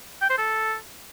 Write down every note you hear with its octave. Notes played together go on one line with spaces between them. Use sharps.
G5
C5
A4